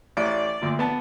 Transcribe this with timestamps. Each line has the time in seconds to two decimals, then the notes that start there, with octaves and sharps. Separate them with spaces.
0.17 A1 D5
0.61 D2 A#2
0.79 B3 A5